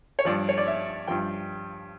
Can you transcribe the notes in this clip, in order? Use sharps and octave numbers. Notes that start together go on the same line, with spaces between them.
C#5
G2 F3 D5
C#5
D5
E5
G2 F3 G5